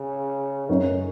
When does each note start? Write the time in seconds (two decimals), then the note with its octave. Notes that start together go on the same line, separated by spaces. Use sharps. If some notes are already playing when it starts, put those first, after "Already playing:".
Already playing: C#3
0.68 F#2 C#3 F#3 D#4 A#4 C#5